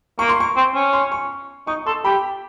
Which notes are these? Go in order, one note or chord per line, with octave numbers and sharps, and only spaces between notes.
A#3 C#6
C6
C#6
C4
C#4
C6
C#6
D#4 C#6
A4 C6
G4 B5